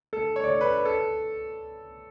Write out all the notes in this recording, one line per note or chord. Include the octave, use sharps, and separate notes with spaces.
A4
C#5
D5
C#5
B4
A4